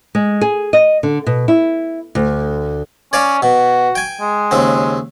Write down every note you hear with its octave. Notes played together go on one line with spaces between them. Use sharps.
G#3
G#4
D#5
D3
B2
E4
D2
C#4 C#5 D5 F5
B2 F#4
G5 G#5
G#3
D#2 C#3 C4